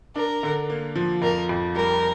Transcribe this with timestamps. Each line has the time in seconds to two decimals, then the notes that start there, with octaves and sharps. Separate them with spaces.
0.16 D4 A#4
0.43 D3
0.70 A#3
0.96 F3
1.22 F2 A#4
1.49 F2
1.75 G3 A#4